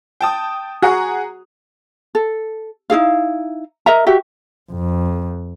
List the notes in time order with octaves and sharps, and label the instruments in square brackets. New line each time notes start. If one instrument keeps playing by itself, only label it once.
[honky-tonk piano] G5 A5 D#6
[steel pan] F#4 [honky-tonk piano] G#4 F#5 A#5
[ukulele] A4
D#4 E4 G#4 F5
A#4 D#5 E5 A#5
F#4 G4 E5
[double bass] F2